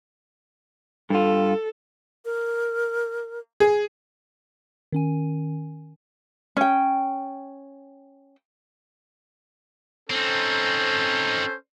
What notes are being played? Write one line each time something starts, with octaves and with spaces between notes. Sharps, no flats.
G2 F4 A4
A#4
G#4
D#3 C#4 G#5
C#4 G5
C4 C#4 D#4 A4 C5